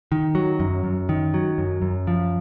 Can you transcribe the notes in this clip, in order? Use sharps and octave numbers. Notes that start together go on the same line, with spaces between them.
D#3
F#3
F#2
F#2
D#3
F#3
F#2
F#2
F3